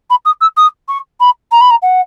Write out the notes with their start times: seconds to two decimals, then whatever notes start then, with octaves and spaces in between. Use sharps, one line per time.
0.10 B5
0.25 D#6
0.41 E6
0.57 D#6
0.88 C#6
1.20 B5
1.51 A#5
1.60 B5
1.70 A#5
1.82 F#5